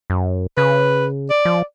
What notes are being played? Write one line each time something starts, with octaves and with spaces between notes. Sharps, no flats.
F#2
C#3 B4
D5
F3